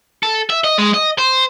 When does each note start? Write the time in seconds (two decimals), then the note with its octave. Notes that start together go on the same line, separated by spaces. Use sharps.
0.23 A4
0.50 E5
0.64 D#5
0.78 G#3
0.93 D#5
1.18 C5